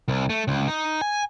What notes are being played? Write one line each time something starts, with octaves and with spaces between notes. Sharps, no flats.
C2
A3
C#2
D#4
G#5